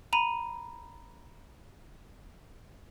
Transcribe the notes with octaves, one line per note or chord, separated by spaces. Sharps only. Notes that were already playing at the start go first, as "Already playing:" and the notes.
A#5 B5 D#7